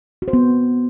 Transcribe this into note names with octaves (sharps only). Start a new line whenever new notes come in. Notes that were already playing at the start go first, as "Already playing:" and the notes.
F#4
C5
B3